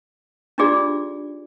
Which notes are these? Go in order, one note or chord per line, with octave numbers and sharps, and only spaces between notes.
D4 D#4 F4 G4 G#4 D5